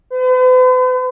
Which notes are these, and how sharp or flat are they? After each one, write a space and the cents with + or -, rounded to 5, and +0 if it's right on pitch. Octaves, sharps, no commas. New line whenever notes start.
B4 +45